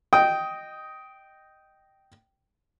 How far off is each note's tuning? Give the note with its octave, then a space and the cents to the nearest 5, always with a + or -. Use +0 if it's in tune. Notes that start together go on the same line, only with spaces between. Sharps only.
D#5 -10 G5 -10 D#6 +15